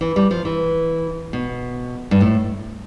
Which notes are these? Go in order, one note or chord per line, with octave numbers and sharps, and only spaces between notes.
E3
G3
F3
E3
B2
G2
A2